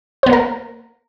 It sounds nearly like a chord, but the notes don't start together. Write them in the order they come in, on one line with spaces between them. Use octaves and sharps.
C5 B3 A#3 A#4